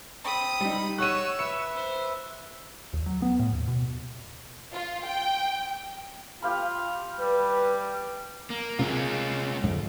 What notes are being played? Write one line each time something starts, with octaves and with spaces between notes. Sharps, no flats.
C4 B5 D#6
G3 D#4
F#4 C#5 E6 F#6 D#7
B4 E5 C#7 E7
C5
D#2
F#3
B3
A2
D#2
B2
F4
G5
F4 G4 F5 B5
G3 B4
A#3
C3 G#3 A#3 C4 F4
F2 G#2 D3